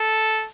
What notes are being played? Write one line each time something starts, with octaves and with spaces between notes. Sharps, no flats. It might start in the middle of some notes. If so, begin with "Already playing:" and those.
Already playing: A4